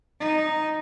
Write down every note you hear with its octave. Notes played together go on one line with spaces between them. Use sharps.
D#4